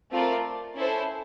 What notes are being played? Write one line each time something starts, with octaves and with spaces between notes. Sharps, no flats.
A3 C4 F4 A#4 D5
C#4 E4 A4 C5